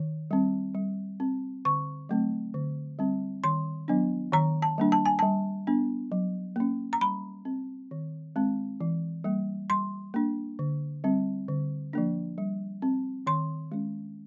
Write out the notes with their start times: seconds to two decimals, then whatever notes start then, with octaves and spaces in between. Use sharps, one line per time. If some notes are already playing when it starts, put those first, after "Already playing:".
Already playing: D#3
0.31 G3 C4
0.75 G3
1.20 C4
1.65 D3 C#6
2.09 F#3 A3 C4
2.54 D3
2.99 G3 C4
3.44 D#3 C6
3.88 F#3 B3 D4
4.32 D#3 A#5
4.62 A5
4.78 G3 A#3 D4
4.92 A5
5.06 G#5
5.19 G3 A5
5.67 B3 D4
6.12 F#3
6.56 A#3 C#4
6.93 A#5
7.01 G3 B5
7.45 C4
7.91 D#3
8.36 G#3 C4
8.80 E3
9.24 G3 A#3
9.70 G3 C6
10.14 A#3 D4
10.59 D3
11.04 G3 C4
11.48 D3
11.93 F3 A#3 D4
12.38 G3
12.82 C4
13.27 D#3 C6
13.72 G#3 C#4